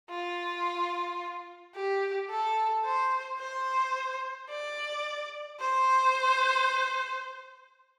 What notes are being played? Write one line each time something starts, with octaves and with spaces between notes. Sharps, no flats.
F4
G4
A4
C5
C5
D5
C5